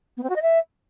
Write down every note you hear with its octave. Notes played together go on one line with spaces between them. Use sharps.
B3
C4
F#4
D#5
E5